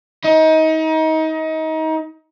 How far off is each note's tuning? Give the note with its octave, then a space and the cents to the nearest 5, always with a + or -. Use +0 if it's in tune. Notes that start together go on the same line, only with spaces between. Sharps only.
D#4 +30